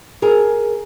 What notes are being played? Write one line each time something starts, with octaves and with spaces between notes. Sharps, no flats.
G#4 A#4